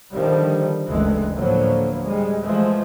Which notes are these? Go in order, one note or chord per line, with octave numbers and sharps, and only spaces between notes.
D3 D#3 F3 G3
F#1 D2 E3 G#3 A3
A2 D3 F3 F#3 A#3 B3
G3 G#3
E3 F3 G#3 A3